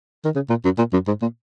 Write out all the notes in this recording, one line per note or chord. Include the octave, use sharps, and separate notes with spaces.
D#3
C#3
A#2
F#2
A#2
F#2
G#2
A#2